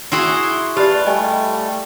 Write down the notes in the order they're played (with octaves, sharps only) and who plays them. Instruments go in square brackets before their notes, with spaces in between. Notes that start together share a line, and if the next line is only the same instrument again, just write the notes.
[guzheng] E4 F#4 G#4 [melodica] C6
[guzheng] F4 [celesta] G4 D5 [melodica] B4 A5
[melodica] G3 A3 [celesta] D#5 G#5